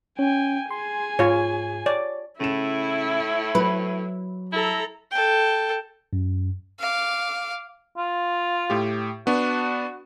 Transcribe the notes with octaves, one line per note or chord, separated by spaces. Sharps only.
C#4 G5 G#5
G#4 G#5 C6
G#2 F4 C#5
C#5 D5
A2 C#3 E4 E7
F#3 B4
E4 A4 A#5
A4 G5
F#2
F5 D6
F4
A2 G4
B3 D4 F#4